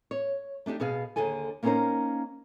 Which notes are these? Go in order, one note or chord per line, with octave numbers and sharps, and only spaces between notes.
C#5
A3 D4 D#4 G4
B2 B3 G#4 F5
D#2 D3 G#4 A4 G#5
A#3 B3 C#4 D#4 A#4 C5